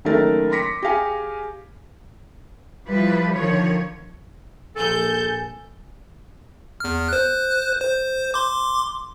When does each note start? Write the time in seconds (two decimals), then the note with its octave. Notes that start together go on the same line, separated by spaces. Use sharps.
0.05 F#1 D#3 A3 A4 A#4 A6
0.51 C6 D6 A#6 B6 C#7
0.82 G4 G#4 F5 G#5
2.88 F3 G3 E4 B4
3.35 D3 D#3 F3 C#5
4.76 A#1 A4 G#5 G6
6.80 E2 F6
7.09 C5 F#6
7.80 C5
8.34 C6 D6